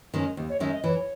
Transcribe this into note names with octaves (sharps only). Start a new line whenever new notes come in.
D#3 G#3 C#4
D#2
C#5
D#3 G#3 C#4 E5
D#5
E3 C#5